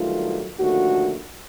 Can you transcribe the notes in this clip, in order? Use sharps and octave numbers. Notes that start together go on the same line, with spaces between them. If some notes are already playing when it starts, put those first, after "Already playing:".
Already playing: G2 D#3 F#3 A3 F4
D#2 D3 F3 A3 F#4